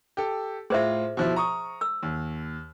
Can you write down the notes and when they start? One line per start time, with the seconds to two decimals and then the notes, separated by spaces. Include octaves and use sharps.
0.17 G4 A4
0.70 A2 F4 G#4 C5 E5
1.17 B2 F3 E4
1.36 A#5 C#6 D#6
1.81 E6
2.03 D#2